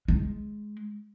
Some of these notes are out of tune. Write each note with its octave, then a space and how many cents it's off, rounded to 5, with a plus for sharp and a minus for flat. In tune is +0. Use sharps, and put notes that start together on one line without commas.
G#3 +10